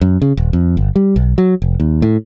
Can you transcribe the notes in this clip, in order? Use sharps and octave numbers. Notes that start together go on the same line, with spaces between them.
F#2
C#3
D#1
F2
G1
G3
B1
F#3
F1
D#2
A2